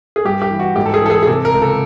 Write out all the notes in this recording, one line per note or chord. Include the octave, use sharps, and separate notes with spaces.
G#4
G2 G4
G4
E3
F#4
G#2 G4
A4
G#4
E3 A4
G#4
G#4
C3 A4
A#4
C#2
A4